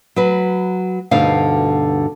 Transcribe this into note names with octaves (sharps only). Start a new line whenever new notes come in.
F#3 B4
D2 G2 B2 D3 D#4 F5